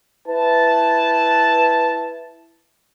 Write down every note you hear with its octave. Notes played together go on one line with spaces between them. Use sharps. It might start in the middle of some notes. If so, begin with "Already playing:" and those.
E4 B4 A5